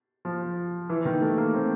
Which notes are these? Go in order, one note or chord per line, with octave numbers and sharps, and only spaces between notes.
F3
E3
D#3
A3
A#3
C4